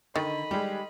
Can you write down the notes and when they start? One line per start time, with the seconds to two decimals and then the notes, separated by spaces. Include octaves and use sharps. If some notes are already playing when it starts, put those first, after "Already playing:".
0.16 D3 D#3 D#5 B5
0.51 G3 G#3 G4